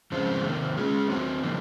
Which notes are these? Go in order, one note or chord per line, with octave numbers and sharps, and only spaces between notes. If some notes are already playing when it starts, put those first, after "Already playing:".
C#3 F3 G#3 C4 F4
C3 D#3 A#3
G#3 C#4 F4 G#4
F#3 C4 F#4
C#3 F3 A#3 D#4